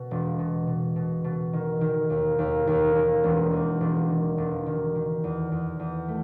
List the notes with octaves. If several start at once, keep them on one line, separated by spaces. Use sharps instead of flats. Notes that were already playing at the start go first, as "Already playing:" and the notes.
Already playing: B2
E1
B2
B2
B2
B2
D#3
D#3
D#2
D#2
D#2
D#2
E1
E2
E1
D#3
E1
D#3
D#3
E2
E2
E2
A3